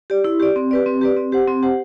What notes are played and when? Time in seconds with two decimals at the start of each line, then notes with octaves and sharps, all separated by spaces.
0.10 G4 D5
0.24 E4
0.40 G4 D5
0.56 C4
0.71 G4 B4 D5
0.86 C4
1.01 G4 B4 D5
1.17 C4
1.32 G4 C5 F#5
1.48 C4
1.63 G4 C5 F#5